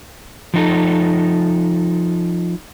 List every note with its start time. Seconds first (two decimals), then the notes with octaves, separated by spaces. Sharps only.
0.54 F3 D#4 A4